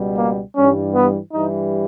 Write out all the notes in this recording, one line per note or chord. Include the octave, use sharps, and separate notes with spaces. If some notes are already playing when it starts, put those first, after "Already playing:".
Already playing: C#2 B2 G3
A#3
G2 E3 G3 C#4
B3
G2 E3 G3 D#4